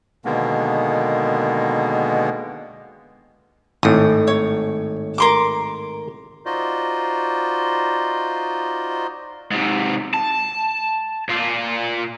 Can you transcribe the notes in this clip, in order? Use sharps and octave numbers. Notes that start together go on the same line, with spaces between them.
B2 D3 D#3 G#3 A#3 B3
G#1 A2 D#6
C#5
A#4 C6 D6
D#4 F4 F#4 C5 D5 D#5
G#2 C3
A5
A#2 F4